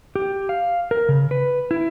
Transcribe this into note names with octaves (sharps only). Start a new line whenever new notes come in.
G4
F5
A#4
C#3
B4
E4